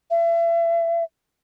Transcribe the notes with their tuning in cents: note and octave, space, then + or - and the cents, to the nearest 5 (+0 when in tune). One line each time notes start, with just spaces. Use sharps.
E5 +35